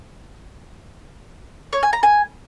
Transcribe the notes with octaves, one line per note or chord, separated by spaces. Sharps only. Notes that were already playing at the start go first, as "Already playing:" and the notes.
C#5
G#5
A#5
G#5